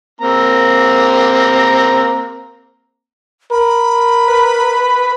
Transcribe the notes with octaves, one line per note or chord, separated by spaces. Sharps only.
A#3 C4 A#5
A#4 B5
B4